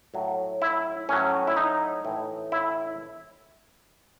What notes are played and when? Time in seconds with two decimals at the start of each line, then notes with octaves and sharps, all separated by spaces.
0.14 A2 F#3
0.62 E4
1.09 A2 F#3 C#4
1.47 E4
1.57 D#4
2.05 A2 E3
2.52 E4